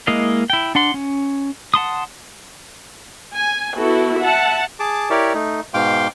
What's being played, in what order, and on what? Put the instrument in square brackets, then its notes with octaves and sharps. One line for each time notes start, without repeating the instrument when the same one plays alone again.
[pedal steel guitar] G#3 A#3 E4 D#5 F5
E4 G5
D4 F#5 C6
C#4
F#5 A5 C6 D#6
[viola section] G#5
B3 E4 F#4 A4
E5 F#5 A5
[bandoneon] G#4 A5 D6
E4 G4 A#4 C#5 D5
A3 D#4
G#2 B2 F5 G5 C6 D6